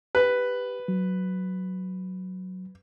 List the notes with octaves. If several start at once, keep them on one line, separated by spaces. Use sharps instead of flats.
G4 B4
F#3